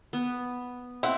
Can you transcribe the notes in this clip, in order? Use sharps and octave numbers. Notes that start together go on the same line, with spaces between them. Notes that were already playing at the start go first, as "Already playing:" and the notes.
B3
C4 E4 F#5